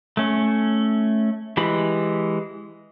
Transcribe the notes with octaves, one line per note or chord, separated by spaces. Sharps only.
A3 C#4
E3 G#3 G4 B5